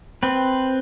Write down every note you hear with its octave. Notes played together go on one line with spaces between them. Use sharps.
C4 B4